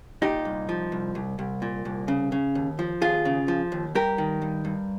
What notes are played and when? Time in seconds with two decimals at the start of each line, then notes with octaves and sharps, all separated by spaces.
0.22 A#2 D#4 G4
0.45 C2
0.69 F3
0.92 C2
1.15 C2
1.39 C2
1.62 A#2
1.85 C2
2.08 C#3
2.32 C#3
2.55 D#2
2.79 F3
3.01 D#2 F4 G#4
3.25 C#3
3.48 F3
3.72 D#2
3.95 G2 G4 A#4
4.18 D#3
4.42 G2
4.65 G2